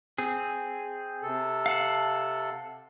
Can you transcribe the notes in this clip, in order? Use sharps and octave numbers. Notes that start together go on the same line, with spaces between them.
C4 G#4
C3 A4
F5 F#5 A5